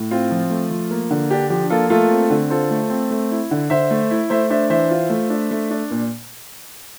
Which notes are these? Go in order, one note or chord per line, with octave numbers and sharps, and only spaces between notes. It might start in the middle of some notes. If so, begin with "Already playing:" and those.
Already playing: A2
C4 F4
F3
A3
F3
A#3
D3
D4 G4
F3 G4
A#3 F4 A4
A3 F4 A4
C4
D3
F4 A4 C5
A3
C4
A3
E4
D3
D3 C5 E5
A3
E4
A3 C5 E5
D4 C5 E5
E3 C5 E5
F4
A3
D4
A3
D4
A#2